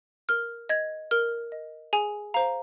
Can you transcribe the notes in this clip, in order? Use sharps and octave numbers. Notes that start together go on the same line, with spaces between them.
A#4 F6
D#5 G#6
A#4 F6
D#5
G#4 G#5
C5 F5 A#5